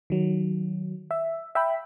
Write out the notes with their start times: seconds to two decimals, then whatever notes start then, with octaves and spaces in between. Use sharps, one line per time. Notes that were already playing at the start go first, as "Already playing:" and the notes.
0.10 D#3 F#3
1.11 E5
1.55 E5 G5 B5